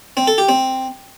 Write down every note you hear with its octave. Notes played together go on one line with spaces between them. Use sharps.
C4
A4
G4
C4